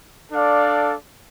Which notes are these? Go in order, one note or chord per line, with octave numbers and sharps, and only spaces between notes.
D4 A4 D5 F5